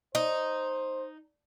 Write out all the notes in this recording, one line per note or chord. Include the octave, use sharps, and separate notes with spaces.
D#4 C5